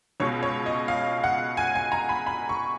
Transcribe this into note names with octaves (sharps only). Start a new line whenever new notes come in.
C#2 B2 C#5
C#5
D#5
F5
F#5
G#5
G#5
A#5
B5
B5
C#6